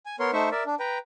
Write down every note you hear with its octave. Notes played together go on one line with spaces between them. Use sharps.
G#5
B3 A#4 C#5 C6
A3 D#4 C5 E5 C#6
A#4 D5 E5
D4
B4 G5 A#5